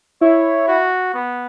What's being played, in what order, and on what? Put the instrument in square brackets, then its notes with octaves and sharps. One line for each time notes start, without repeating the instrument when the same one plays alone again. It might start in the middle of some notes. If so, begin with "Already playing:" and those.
[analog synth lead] E4 [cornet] C#5
[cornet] F#4
B3